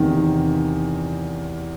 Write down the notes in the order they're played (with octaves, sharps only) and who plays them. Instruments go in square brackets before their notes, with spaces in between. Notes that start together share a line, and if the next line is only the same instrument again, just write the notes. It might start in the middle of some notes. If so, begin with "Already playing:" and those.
Already playing: [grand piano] E2 C3 D#3